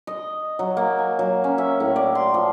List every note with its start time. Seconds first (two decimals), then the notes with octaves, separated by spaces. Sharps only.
0.07 D#5
0.59 F#3
0.77 A#3
0.99 G#5
1.19 F#3
1.44 C#4
1.58 E5
1.80 A2
1.96 D5
2.15 C6
2.34 F3